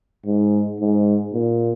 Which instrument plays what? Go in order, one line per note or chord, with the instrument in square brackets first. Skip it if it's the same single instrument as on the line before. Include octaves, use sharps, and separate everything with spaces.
[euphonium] G#2
G#2
A#2